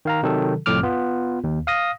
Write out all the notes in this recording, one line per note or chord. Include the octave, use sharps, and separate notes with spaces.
D#3 F5 A#5
C3 D#3 F#3 A4
C2 F2 A2 D6 F6
B3 F4
D#2
F5 D#6 A#6